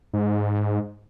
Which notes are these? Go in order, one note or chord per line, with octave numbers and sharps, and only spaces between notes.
G#2